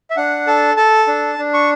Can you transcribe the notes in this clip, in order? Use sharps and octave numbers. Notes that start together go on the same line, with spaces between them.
E5
D4 F#5
A4 A5
A4 A5
D4
D4
C#6